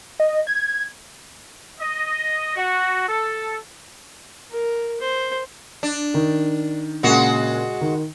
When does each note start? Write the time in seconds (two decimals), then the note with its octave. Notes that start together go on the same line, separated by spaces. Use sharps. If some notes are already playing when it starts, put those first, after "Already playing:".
0.20 D#5
0.47 G#6
1.81 D#5
2.56 F#4
3.09 A4
4.51 A#4
5.01 C5
5.83 D4
6.14 D#3
7.03 A#2 C#3 G#3 F#4
7.81 D#3